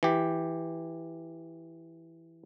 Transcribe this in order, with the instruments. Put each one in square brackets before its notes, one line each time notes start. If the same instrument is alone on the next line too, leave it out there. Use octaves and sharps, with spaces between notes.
[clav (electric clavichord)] E3 G4